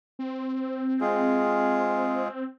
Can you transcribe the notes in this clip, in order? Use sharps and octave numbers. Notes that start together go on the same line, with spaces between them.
C4
G#3 F4 G#4